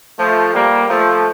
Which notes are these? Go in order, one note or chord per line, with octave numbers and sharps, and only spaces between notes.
F3 A3
G3 A#3
F3 A3